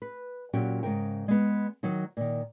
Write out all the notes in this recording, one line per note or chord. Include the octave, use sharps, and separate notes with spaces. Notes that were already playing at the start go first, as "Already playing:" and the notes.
B4
A#2 F#3 C#4 F#4 G4 G5
G#2 C#3 A#4 G5
G#3 B3
D#3 F#3 D#4
A#2 D#3